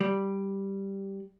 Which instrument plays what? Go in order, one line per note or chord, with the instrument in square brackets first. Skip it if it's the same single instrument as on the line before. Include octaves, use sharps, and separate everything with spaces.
[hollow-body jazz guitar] G3